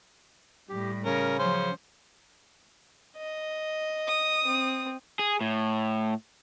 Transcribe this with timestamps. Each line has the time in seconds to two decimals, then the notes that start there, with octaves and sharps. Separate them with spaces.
0.69 A2 G3 G4
1.05 C#3 C#4 A#4
1.39 F3 F#3 C#4 C5
3.18 D#5
4.07 D#6
4.46 C4
5.19 G#4
5.41 A2